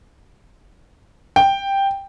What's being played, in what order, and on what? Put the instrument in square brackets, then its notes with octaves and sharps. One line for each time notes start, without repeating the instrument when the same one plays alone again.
[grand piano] G5